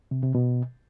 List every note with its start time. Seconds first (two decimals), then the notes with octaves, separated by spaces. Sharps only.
0.11 C3
0.23 C3
0.35 B2